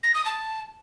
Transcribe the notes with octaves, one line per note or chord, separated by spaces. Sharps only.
A#6
D#6
A5